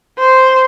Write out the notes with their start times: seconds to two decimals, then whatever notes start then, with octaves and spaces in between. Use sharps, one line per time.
0.18 C5